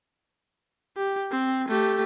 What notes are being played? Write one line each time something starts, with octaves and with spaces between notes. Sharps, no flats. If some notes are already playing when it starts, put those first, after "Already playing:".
G4
C4
A3 G4